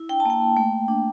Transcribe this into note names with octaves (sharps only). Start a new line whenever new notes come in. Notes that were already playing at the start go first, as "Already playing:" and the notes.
Already playing: E4
D4 G5
A5
A#3 G5
A#3
A3
A3
D4